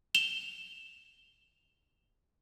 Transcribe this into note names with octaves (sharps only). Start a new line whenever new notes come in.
E7 F7 G7